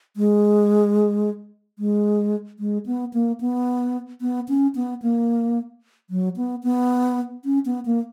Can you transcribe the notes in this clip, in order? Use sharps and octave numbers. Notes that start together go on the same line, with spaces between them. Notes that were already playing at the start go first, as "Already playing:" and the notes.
G#3
G#3
G#3
B3
A#3
B3
B3
C#4
B3
A#3
F#3
B3
B3
C#4
B3
A#3